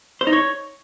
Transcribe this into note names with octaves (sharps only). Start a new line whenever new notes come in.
C5
D#4
C#5